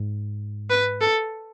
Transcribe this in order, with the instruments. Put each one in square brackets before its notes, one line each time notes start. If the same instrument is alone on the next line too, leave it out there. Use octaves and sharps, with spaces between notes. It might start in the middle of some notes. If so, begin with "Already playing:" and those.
Already playing: [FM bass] G#2
[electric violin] B4
A4